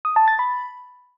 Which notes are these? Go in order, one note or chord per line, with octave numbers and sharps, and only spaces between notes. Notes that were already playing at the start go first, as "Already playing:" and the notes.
D#6
A5
A6
B5